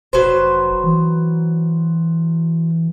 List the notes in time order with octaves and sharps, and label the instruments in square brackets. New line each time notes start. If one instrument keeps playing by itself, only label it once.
[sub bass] F1 [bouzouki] F#3 B4 C5
[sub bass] E3